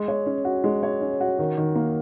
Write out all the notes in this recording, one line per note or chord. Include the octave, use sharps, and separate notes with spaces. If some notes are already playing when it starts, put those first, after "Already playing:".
Already playing: G#3
C#5
C#4
F#4
G#3
C#5
C#4
F#4
D#3
D#3
A#3